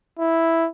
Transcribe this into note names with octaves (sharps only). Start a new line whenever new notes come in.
E4